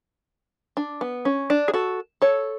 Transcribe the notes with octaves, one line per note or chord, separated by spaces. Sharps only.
D4
B3
C#4
D4
G#4
F#4 A4
A4 C#5